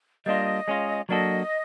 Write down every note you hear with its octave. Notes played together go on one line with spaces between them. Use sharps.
G3 A#3 D4 F4 D#5
G#3 C#4 F4
F#3 A#3 D4 F#4 A4 D#5